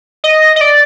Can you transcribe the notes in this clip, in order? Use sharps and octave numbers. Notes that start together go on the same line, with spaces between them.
D#5
D#5
D5